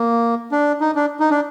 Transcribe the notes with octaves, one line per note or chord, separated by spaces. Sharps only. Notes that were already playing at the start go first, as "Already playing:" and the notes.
Already playing: A#3
D4
D#4
D4
D#4
D4